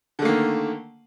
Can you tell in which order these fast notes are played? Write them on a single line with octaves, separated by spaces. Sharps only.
D3 A3 A#3 D#3